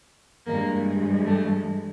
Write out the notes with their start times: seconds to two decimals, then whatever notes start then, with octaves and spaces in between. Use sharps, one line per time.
0.46 G2 E3 G#3 A#3
1.25 A3